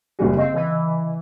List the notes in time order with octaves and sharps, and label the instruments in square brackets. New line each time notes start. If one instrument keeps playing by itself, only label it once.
[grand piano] F#1 G3 G#4 [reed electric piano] F#4
[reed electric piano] C#3 D#5 [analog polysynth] C4 [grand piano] F5
[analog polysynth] E3